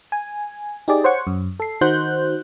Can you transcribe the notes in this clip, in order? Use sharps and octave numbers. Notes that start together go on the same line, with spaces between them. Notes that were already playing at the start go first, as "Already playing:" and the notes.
G#5
D#4 G4 G#4 D5
C5 C#5 F#5 C#6
F#2
A4 C7
D#3 D#4 F#4 C5 F#6 G6